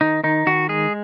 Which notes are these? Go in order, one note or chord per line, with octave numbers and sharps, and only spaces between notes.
D#3 D#4
D#3 D#4
D#3 F#4
G#3 G#4